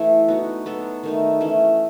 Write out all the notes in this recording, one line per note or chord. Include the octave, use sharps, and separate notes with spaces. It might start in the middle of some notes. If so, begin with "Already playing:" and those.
Already playing: E3 A3 E4
B3 D#4 F#4
F#3 B3 F#4 A4
D#3 A3 D#4
E3 A3 C#4